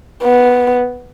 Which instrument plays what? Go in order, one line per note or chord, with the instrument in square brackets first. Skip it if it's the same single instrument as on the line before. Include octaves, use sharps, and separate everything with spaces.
[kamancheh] B3